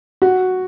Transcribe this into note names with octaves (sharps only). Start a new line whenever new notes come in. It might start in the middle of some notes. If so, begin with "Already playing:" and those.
F#4